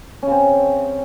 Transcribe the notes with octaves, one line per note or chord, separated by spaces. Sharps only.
C#3 C4 C#4